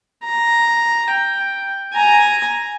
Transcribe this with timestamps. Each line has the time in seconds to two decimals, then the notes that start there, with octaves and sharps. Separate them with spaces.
0.24 A#5
1.11 G5
1.93 G#5 A#5